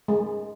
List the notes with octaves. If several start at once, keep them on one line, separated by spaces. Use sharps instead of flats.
G#3